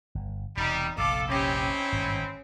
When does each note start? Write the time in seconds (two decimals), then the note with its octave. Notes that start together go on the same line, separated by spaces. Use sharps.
0.15 G1
0.57 E1 C3 G3 D#4
0.98 F1 A#1 F2 A4 F5 D6
1.28 C4 C#4 D#4 E4 G4
1.60 C#4
1.92 G#1 G2 A#2